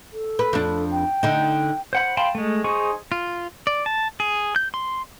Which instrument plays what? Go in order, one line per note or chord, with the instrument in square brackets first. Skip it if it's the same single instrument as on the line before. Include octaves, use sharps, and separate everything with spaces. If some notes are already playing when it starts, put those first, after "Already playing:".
[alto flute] A4
[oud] B4
F2 D4
[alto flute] G5
[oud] D3 D#4
[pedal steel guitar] C5 F#5 B5
F5 G5 A5 B5 C6
G#3 A3
D#4 G#4 C5 C#6
F4
D5
A5
G#4
G6
C6